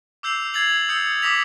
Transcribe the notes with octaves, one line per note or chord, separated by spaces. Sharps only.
D6 E6 G6 C7 F7
G#6 A6 C7 F7 F#7
D#6 E6 G6 C7 C#7
D6 D#6 A#6 B6 F7